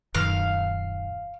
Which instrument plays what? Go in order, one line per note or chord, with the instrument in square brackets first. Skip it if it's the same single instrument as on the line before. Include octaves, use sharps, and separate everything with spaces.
[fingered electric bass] D#1 F#2 D#3 [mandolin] F5